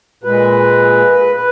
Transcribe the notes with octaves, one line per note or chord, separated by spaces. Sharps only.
A#2 G#3 B4
B4